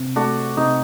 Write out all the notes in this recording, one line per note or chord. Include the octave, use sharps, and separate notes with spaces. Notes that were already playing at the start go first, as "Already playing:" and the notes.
Already playing: C3
A3 D4 F#4
C3 D#4